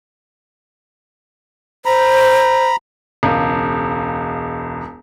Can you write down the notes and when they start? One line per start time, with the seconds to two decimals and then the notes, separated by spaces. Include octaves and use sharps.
1.86 C5 A#5 B5
3.23 E1 C#2